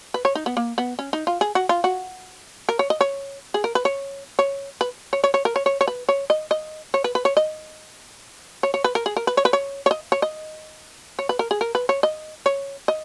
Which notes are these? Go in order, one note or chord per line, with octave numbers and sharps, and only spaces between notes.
B4
C#5
D#4
B3
A#3
B3
C#4
D#4
F4
G#4
F#4
F4
F#4
A#4
C#5
D#5
C#5
G#4
A#4
B4
C#5
C#5
B4
C#5
C#5
C#5
A#4
C#5
C#5
C#5
B4
C#5
D#5
D#5
C#5
B4
B4
C#5
D#5
C#5
C#5
B4
A#4
G#4
A#4
B4
C#5
B4
C#5
C#5
D#5
C#5
D#5
C#5
B4
A#4
G#4
A#4
B4
C#5
D#5
C#5
D#5